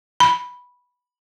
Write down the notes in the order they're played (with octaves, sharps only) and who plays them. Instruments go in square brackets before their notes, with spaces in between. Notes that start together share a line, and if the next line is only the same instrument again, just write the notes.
[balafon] B5